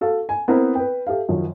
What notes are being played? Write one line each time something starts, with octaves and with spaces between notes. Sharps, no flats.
F#4 A4 F5
G#5
B3 C4 E4 A#4 B4
B4 G5
G4 A4 E5 F5
F#2 D#3 F3